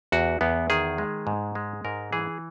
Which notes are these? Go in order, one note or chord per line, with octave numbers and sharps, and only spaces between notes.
E2 F#4
E2 B3
D#3 G#4
G#3
G#2
G#3
G#2 A#4
E3 G#4